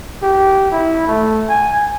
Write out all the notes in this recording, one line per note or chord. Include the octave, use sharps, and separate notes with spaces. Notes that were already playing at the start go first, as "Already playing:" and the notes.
G4
E4
A3
G#5